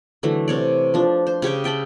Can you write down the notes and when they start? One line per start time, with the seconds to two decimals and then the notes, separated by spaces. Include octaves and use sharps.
0.23 D3 E3 F#3 A3
0.48 C3 C#5 D5
0.94 F3 D4
1.27 C5
1.42 C#3 G4 C#5 G5
1.64 E5 G5 A5 B5